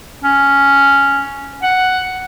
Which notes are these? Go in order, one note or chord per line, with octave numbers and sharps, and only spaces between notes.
C#4
F#5